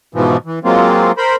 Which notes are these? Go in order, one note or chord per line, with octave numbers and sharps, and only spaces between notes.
G#2 B2 E3 F3
E3
F#3 G#3 A#3 C4 F4
A#4 C5 B5